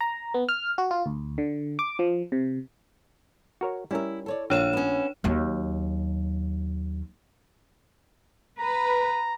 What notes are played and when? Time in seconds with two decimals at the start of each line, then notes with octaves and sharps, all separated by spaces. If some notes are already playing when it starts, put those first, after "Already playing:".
0.01 A#5
0.34 B3
0.49 F6
0.78 F#4
0.91 F4
1.06 D2
1.38 D3
1.79 D6
1.99 F3
2.32 C3
3.61 F#4 A#4 C#5
3.91 G3 C#4 E4 A#4 E5
4.26 A4 C#5 D5
4.50 A#1 A#2 D3 D4 C#5 F5 E7
4.73 B3 C#4
5.24 D#2 F#3
8.59 B4 A#5